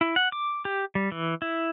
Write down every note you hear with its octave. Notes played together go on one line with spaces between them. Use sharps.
E4
F#5
D6
G4
G3
E3
E4